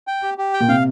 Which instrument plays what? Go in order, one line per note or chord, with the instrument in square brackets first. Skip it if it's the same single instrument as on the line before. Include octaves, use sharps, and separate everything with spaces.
[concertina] G5
G4
G4
G5
[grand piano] A#2
[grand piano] C3 [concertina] F5